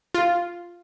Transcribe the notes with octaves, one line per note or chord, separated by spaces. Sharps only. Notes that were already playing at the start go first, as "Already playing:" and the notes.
F4